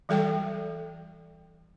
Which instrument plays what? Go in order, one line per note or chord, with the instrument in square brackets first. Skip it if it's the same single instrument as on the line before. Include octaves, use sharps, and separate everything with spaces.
[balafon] E3 G3 A4 G5